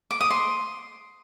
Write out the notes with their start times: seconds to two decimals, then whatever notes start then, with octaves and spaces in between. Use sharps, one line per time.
0.11 D6
0.21 D#6
0.30 C6